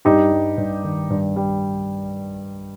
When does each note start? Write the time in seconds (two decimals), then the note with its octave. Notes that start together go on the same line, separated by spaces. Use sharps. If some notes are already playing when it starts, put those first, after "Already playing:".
0.05 G2 D#4 G4
0.32 G3
0.58 G2
0.84 D#3
1.10 G2
1.36 G3